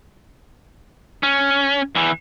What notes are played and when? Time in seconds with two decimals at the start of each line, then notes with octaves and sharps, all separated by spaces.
1.23 C#4
1.95 E2 E3